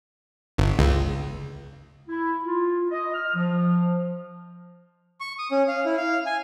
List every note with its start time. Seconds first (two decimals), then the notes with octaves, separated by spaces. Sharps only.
0.58 G1
0.79 C#2
2.09 E4
2.45 F4
2.91 D#5
3.14 F6
3.35 F3
5.20 C#6
5.39 D#6
5.51 C#4
5.68 F5
5.85 E4
5.97 F5
6.26 G#5